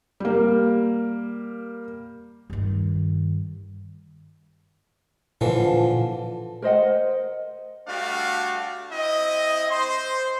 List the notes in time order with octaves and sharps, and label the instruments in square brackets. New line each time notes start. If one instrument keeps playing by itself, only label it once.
[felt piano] G3 A#3
[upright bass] G2 D#3
[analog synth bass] A#2 [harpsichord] D3 E3 F3
[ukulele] A#4 C5 D#5 F#5
[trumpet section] G3 A3 D4 F#4 F5
C4 E4 D#5
C5 C6